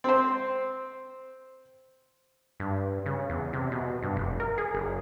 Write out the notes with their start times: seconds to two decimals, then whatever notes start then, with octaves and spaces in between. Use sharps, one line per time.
0.04 C4 C5
2.60 G2
3.06 C#3
3.30 E2
3.53 C3
3.72 B2
4.03 G2
4.17 F1
4.40 A#4
4.58 G#4
4.75 F#1